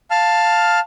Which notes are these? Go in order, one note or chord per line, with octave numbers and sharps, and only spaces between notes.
F5 A5 F6